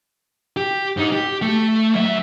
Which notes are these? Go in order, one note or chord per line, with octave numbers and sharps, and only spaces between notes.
G4
G#2 D#4
G4
A3
F#3 E5